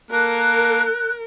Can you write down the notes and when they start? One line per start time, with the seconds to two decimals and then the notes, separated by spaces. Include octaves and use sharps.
0.11 A#3 A4 A#4 F#6